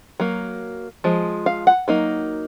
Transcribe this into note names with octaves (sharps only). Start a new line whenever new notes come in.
F#3 A#3
F3 G#3
F5
F#5
F#3 A#3 D#4